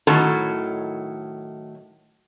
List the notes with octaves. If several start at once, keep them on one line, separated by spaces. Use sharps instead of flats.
A2 D#3 F#3 C#4 A4